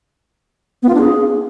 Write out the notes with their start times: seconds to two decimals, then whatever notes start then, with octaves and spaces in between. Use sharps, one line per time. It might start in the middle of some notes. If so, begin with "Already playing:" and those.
0.83 B3
0.89 F4
0.95 D4
1.01 G#4